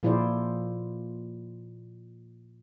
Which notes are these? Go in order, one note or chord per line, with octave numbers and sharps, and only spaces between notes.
A#2 F3 E4 G#4 C5 D5